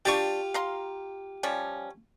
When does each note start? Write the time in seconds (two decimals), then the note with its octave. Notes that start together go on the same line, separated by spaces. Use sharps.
0.05 G3 D4 F4 G4 C#6
0.54 F5 A#5 C6
1.43 F3 G3 C#4